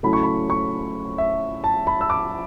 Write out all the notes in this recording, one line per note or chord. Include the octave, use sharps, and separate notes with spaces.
C#3 F#3 A3 C#4 E4 B5
C#6
B5
C#6
E5
A5
B5
E6
D6